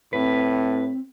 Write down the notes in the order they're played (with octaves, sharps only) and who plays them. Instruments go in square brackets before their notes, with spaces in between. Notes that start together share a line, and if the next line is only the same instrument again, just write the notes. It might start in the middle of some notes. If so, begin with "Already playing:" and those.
[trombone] A2 [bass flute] C4 [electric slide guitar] B4